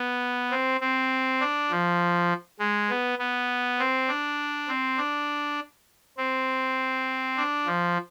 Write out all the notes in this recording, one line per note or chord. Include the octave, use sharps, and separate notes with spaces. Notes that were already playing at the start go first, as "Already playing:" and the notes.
Already playing: B3
C4
C4
D4
F3
G#3
B3
B3
C4
D4
C4
D4
C4
D4
F3